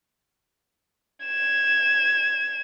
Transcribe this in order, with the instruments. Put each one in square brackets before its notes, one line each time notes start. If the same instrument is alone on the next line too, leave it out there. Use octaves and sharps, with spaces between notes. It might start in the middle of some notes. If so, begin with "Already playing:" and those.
[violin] G#6 E7